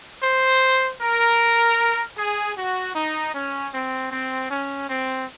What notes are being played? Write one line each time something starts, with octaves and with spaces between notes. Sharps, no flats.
C5
A#4
G#4
F#4
D#4
C#4
C4
C4
C#4
C4